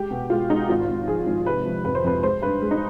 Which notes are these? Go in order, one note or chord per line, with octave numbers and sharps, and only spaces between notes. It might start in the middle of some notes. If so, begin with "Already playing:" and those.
Already playing: G#3 G4
B2
G#3 F4
G#3 D#4
G#1 F4
G#1
F3 G#4
G#1
C3 B4
F3
F2 B4
C5
F2 B4
G#3 C5
G2 B4
G#3
D#4